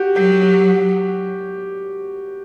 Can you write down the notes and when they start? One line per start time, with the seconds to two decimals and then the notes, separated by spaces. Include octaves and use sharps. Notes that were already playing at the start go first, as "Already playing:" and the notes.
Already playing: F#4 G4
0.16 F#3 G4
0.43 G4